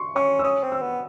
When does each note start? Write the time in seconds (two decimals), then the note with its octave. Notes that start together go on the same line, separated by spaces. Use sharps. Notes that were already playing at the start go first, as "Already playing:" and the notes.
Already playing: C6 C#6
0.16 C#4 C#6
0.39 E6
0.44 C#4 D#6
0.63 C4
0.72 E6
0.82 B3